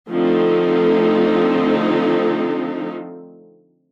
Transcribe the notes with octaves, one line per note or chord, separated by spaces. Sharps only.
D3 F3 A3 C4 D#4